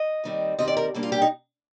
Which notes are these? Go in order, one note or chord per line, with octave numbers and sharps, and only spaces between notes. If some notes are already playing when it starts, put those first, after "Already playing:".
Already playing: D#5
D#2 D#3 G3 C4
D#2 D#3 G3 C4 D#5
D5
A#4
A#2 G3 A#3 D4
F4
G4
D#4